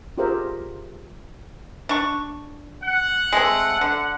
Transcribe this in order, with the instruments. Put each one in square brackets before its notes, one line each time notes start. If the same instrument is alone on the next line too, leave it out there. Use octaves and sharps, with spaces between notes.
[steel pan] F4 G4 G#4 A#4 C5 E5
[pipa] D4 C#6
[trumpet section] F#5
[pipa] G#3 A3 C4
D3